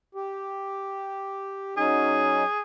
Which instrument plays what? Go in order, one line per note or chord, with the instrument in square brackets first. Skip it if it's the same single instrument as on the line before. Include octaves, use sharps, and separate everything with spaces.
[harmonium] G4
[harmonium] F#3 C#4 D#4 [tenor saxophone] G#4